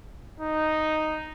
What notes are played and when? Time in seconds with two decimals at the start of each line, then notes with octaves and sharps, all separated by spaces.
0.40 D#4